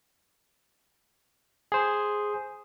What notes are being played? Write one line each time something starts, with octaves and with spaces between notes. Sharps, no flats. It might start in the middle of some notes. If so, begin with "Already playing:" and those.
G#4 C5